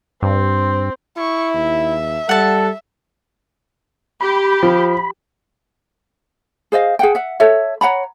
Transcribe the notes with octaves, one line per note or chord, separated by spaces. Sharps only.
G2 C4
E4 C#6
D#2 E5
G3 A4 F#5 A5
G4 B5
F3
G#4 C5 D#5 F5
G#4 F#5 G5
E5 F#5
A4 C#5 E5
C#5 F#5 A#5 B5